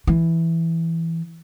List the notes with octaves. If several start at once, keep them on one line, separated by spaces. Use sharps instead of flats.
E3